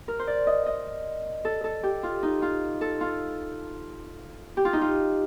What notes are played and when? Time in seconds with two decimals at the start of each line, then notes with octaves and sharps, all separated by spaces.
0.08 A#4
0.19 C5
0.27 D5
0.47 D#5
0.66 D#5
1.45 A4
1.64 A4
1.83 G4
2.03 F4
2.23 D#4
2.42 F4
2.81 A4
3.01 F4
4.57 G4
4.65 F4
4.73 D#4
4.81 F4